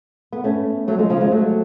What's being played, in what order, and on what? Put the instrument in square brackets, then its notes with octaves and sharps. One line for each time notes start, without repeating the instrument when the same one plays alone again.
[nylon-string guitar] B3
A3 C#4
F#3 A3
F3 G#3
C#3 F3
F3 G#3
F#3 A3